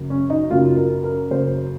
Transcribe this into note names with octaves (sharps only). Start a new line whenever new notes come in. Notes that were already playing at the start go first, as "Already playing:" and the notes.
Already playing: F#2 C#3 F#3 A#3
C#4
D#4
F#2 C#3 F#3 A#3 F4
A#4
A#4
F#2 C#3 F#3 A#3 C5